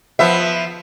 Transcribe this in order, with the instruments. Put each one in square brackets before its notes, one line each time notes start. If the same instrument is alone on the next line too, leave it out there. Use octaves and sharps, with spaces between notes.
[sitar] F3 B3 E5